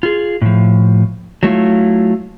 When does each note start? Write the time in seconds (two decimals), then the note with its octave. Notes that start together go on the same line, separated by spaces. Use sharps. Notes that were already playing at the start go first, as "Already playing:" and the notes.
0.03 F4 G#4
0.42 A2 F3
1.43 F#3 A3 E4 F4